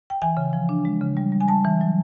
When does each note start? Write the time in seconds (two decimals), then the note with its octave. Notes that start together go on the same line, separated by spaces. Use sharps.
0.10 G5
0.22 E3 G#5
0.37 C#3
0.53 F3
0.69 D4
0.85 G#3
1.01 C#3
1.17 G3
1.32 G3
1.40 G#5
1.48 G3 A5
1.65 E3
1.81 F#3